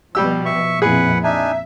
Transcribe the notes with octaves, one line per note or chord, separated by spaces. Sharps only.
B2 F3 G3 G4 E6
E5 C#6
F2 A#2 E4 G#4 B4 F#5
D4 D#4 E5 G#5